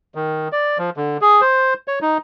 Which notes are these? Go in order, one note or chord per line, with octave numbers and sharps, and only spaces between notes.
D#3
D5
F3
D3
G#4
C5
C#5
D#4